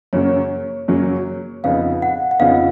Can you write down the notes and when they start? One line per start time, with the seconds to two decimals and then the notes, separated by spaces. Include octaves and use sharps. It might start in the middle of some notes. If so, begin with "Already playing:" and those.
0.13 F#2 C#3 F#3 A#3 C#4 C#5
0.88 F#2 C#3 F#3 A#3 C#4
1.64 F2 C#3 F3 B3 D#4 F5
2.02 F#5
2.31 F#5
2.39 F2 C#3 F3 B3 D#4 F5